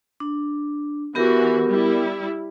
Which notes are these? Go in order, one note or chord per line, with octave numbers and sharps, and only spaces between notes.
D4
E3 B3 F#4 G4 A#4
G3 E4